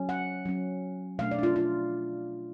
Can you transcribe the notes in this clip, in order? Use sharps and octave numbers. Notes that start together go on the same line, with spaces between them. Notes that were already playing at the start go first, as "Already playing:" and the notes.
Already playing: F#3 C#4
F#5
F#3 C#4
B2 A3 D4 F5
D5
D4
F4
F4